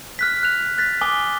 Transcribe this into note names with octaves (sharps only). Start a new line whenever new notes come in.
F6 F#6 B6
F#6 F7
F#6 A6 B6
G#5 D6 D#6 G7